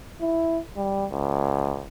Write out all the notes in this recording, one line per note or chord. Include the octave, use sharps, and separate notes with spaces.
E4
G3
C#2